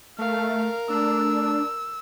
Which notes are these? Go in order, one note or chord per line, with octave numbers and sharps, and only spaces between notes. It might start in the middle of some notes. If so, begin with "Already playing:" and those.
A3 A#4 F5
A3 D4 E6